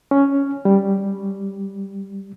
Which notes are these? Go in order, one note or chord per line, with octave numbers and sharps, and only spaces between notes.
C#4
G3